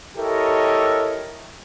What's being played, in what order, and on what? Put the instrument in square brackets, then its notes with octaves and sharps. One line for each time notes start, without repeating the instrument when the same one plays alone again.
[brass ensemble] E4 G4 A4 A#4 C#5 D#5